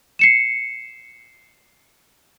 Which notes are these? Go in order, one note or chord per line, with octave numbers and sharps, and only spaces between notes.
C7 C#7 E7